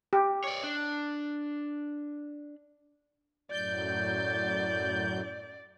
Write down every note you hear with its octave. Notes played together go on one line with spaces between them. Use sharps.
G4
C#5 D5
D4
F#2 A2 F#3 D5 G6